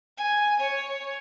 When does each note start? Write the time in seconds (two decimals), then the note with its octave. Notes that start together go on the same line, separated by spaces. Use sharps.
0.18 G#5
0.60 C#5